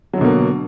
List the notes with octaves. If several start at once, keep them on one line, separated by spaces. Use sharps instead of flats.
B2 D3 F#3 A#3